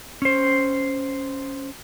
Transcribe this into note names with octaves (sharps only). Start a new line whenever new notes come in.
C#4 C5